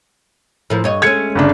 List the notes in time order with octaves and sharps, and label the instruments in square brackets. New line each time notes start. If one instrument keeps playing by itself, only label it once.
[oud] A2 F3 A#4
G2 C#5 D#5
[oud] G#3 A3 C#4 [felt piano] G#6 C#7
[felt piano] G1 C#3 D4